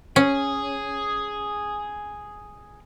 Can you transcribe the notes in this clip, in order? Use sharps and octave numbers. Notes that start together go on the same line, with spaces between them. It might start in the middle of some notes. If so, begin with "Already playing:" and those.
C#4 G#4